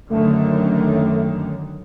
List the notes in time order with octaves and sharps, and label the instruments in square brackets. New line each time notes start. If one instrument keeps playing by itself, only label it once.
[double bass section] F#2 D3 D#3 [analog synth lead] A3